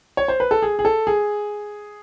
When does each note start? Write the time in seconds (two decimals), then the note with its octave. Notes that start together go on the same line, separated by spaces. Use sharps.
0.17 C#5
0.28 C5
0.40 B4
0.51 A4
0.62 G#4
0.79 G#4
0.85 A4
1.07 G#4